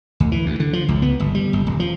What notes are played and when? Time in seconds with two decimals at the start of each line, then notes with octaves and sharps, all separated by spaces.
0.20 D2
0.32 E3
0.46 D2
0.60 D3
0.73 F3
0.88 C#2
1.02 B3
1.20 G1
1.35 G3
1.53 G1
1.67 D#1
1.80 F3